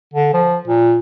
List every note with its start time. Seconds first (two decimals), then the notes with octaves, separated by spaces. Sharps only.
0.14 D3
0.34 F3
0.68 A#2